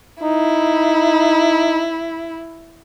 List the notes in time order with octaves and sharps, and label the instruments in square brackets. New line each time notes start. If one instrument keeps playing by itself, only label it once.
[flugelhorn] D#4 [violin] E4